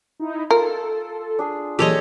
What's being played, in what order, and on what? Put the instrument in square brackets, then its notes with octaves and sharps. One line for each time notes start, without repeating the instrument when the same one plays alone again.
[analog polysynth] D#4 E4
[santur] F4 [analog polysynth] A4 [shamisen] A#4
[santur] D4 G#4
[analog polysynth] A#2 E3 F#3 [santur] G#3 A4 [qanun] G4 C#5 D#5